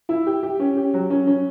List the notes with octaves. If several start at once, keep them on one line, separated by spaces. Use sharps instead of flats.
E4
G4
G4
C#4
G4
F#3
C#4
C#4